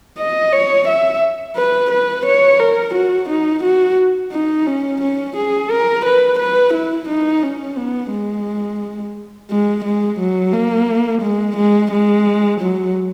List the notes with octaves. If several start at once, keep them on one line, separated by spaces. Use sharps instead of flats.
D#5
C#5
E5
B4
B4
C#5
A#4
F#4
D#4
F#4
D#4
C#4
C#4
G#4
A#4
B4
B4
E4
D#4
C#4
B3
G#3
G#3
G#3
F#3
A#3
G#3
G#3
G#3
F#3